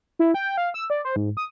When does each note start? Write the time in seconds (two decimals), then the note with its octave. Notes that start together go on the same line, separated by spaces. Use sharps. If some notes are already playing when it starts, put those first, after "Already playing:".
0.19 E4
0.34 G5
0.57 F5
0.74 E6
0.90 D5
1.05 C5
1.16 G#2
1.37 D#6